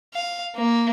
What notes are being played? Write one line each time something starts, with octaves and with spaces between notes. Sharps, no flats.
F5
A#3